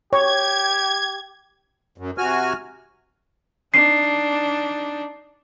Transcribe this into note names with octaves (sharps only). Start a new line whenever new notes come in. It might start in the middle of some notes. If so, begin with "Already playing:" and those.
G4 C#5 G#6
F#2
C3 F#4 G#5 F6
D4 D#4 C7